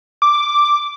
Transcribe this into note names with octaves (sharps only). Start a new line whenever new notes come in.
D6